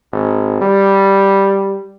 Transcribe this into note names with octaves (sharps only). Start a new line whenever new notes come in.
G#1
G3